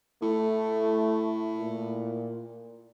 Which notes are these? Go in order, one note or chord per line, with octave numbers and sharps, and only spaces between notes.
A2 A3
A#2